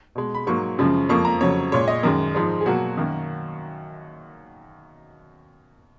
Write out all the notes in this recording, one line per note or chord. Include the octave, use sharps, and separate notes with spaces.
B2 G#3
B5
G#2 F#3 A#3 C#6
F#2 C#3 F3 G#3
F2 F3 A#3 C#6
A#5
F2 C#3 F#3 C#5
A#2 G#3 C#5
D#5
F#2 D#3 G#3 A#4
G#2 F3 G#3
G#4
B2 F#3 A#3 F#4
F#2 D#3 A#3